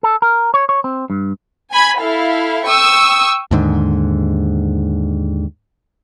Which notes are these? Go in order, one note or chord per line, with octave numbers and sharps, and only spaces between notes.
A4
A#4
C#5
C#5
C4
G2
G#5 B5 G#6
E4 A4 F5
G5 C#6 D#6 E6
D#2 G#2 D3